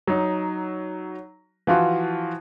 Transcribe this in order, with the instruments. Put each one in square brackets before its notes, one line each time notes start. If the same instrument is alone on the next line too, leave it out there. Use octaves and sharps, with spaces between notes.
[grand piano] F#3 D#4
E3 F3 F4 F#4